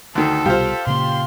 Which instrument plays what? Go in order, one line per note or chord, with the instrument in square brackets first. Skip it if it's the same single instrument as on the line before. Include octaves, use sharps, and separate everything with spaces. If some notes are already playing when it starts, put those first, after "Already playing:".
[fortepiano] D2 D#3 [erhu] A4
[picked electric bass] C2 B2 G3 [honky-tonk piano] F4 G4 [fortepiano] C5 F5
[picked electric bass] A#2 C#3 A#3 [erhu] C6